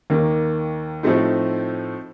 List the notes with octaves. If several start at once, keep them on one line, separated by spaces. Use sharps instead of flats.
D#2 D#3 A#3
A2 F3 A3 C4 D#4